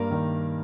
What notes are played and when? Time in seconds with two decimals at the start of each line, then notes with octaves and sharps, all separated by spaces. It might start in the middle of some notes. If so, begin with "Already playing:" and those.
Already playing: G2 A#3 A#4
0.11 D#3